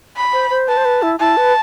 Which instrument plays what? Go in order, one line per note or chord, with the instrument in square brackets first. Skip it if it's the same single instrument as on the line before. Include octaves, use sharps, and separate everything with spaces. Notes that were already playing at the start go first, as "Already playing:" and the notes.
[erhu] B5
[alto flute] C5
C5
[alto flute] B4 [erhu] A5
[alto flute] C5
B4
E4
[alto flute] E4 [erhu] A5
[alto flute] B4